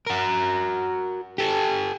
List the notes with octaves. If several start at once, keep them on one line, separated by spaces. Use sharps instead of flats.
F#4 A#4
G4 A4